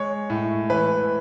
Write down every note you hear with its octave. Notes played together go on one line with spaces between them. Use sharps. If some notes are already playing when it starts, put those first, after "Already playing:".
Already playing: G#3 C#5
A2
E3 B4